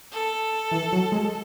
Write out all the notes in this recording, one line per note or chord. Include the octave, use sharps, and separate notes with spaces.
A4
E3
F#3
G#3